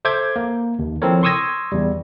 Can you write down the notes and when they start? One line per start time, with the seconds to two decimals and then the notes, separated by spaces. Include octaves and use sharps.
0.05 A4 C5 E5 D6 G6 G#6
0.36 A#3
0.79 D#2
1.02 F3 C4 E4 A4 A#4 C#5
1.23 C6 C#6 D#6 E6 G#6 A#6
1.72 E2 G3